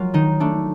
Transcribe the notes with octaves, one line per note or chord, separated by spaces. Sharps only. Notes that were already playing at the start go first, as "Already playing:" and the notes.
Already playing: F#3 G#3 F4 A#4
D#3 D#4
A3 D4